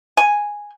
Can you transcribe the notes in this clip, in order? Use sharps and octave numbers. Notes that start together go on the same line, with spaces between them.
G#5